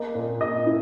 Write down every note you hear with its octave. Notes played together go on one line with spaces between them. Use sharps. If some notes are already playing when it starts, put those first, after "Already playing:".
Already playing: A#3 D#5
A#2
A#2 D#5
E4